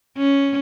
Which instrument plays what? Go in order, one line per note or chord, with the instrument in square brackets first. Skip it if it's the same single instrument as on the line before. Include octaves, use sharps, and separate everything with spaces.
[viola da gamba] C#4